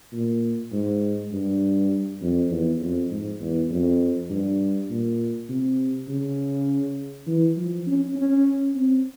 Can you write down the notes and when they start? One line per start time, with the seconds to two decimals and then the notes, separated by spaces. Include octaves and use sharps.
0.13 A#2
0.72 G#2
1.32 G2
2.21 F2
2.50 E2
2.81 F2
3.11 G#2
3.40 E2
3.70 F2
4.30 G2
4.89 A#2
5.49 C3
6.08 C#3
7.27 E3
7.57 F3
7.87 C#4
8.16 C#4
8.75 C4